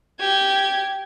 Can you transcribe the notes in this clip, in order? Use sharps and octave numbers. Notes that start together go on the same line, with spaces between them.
G4 G#6